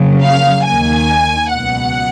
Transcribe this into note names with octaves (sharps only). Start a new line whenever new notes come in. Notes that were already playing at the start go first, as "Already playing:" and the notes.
Already playing: F2 C#3 F#3 A#3
F5
D#2 D#3 A#3 G#5
C#2 B2 F#3 F#5